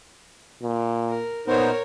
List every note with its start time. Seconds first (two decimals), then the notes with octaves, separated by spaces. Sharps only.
0.63 A#2
1.09 A#4
1.47 A#2 B3 D#4 A#4 C5 C#5